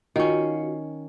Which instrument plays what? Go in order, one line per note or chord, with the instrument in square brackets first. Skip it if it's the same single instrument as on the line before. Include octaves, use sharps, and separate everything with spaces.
[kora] D#3 C#4 [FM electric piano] F4 F#4